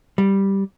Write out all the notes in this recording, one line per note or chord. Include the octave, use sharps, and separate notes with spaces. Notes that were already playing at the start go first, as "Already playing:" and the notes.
G3